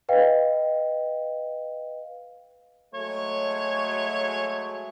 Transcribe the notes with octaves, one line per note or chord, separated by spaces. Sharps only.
B4 D#5 F5 G5
F#3 G#3 A3 C#5